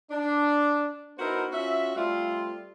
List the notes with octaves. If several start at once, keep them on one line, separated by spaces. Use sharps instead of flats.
D4
B3 D#4 E4 F#4 A#4 C5
C#4 F4 F#4 E5
G3 A3 C4 F4